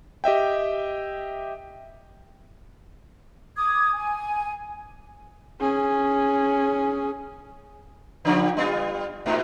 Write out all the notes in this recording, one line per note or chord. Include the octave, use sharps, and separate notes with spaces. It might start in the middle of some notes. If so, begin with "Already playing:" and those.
G4 D#5 E5 G5
D6 D#6 G#6
G#5
C#4 G#4
C#3 F3 G3
G3 B3 F4
G#2 B2 D#4